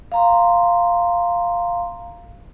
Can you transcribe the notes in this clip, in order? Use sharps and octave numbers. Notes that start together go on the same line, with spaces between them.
F5 A#5 C6